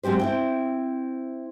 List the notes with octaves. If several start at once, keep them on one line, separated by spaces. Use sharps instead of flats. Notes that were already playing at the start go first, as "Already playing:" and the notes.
F#3 G#3 C4 G4 C5
C4 E4 G5